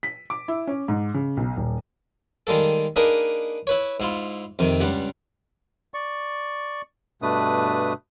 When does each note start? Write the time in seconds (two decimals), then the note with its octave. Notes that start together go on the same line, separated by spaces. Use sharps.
0.03 B6
0.30 D6
0.48 E4
0.67 C#4
0.88 G#2
1.14 C#3
1.37 B1
1.56 D#1
2.47 D#3 G3 G#3 A#3 A4
2.96 A#3 D4 D#4 G#4 A#4 B4
3.67 E4 B4 C#5
4.00 G#2 E4 F4
4.59 F2 C3 D#3
4.81 C#2 G2 G3 F#5
5.94 D5 C#6
7.22 G2 B2 A3 D4 B4 D#6